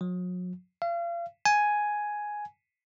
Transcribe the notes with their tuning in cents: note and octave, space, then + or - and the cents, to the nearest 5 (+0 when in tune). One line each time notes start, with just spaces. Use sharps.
F#3 -40
F5 -35
G#5 +5